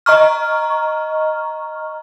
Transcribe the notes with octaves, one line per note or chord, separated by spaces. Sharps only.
D#5 A#5 C#6 F6